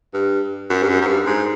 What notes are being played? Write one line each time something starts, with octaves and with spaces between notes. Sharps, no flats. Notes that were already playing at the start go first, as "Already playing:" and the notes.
G2
F#2
G2
F#2
F#2
G2
G#2